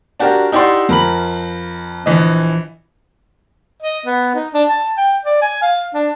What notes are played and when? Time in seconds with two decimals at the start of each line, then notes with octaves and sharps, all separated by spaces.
0.20 D4 F#4 G4 A#4
0.52 D#4 E4 G4 D5 F#5 C6
0.89 F2 A#4 B5 F#7
2.06 A#1 E3 D#5
3.82 D#5
4.06 B3
4.35 D#4
4.54 D4
4.69 A5
4.97 G5
5.25 D5
5.42 G#5
5.62 F5
5.94 D4